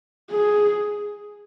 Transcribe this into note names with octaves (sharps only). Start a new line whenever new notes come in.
G#4